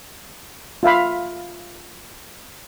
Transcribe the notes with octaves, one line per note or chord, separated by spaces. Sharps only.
F4 E5 F5 B5